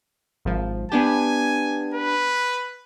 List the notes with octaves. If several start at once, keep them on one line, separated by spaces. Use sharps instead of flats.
G#1 F3
B3 D4 G4 G#5
B4